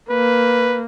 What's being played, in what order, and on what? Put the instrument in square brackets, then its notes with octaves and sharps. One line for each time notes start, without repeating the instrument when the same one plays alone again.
[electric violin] A#3 [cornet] B4